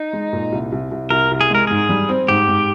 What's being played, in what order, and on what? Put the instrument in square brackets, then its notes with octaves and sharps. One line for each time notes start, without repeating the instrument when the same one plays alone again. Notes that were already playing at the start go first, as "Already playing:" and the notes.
Already playing: [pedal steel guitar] D#4
[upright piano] G#3
A#2
C2
C2
C2
[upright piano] C2 [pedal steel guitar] A#4
[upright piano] C2
[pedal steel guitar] G#4
[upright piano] G#3 [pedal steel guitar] A#4
[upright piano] G#2 [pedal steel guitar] G#4
[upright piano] G3
C4
[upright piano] G#2 [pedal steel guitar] G4
[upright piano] G#2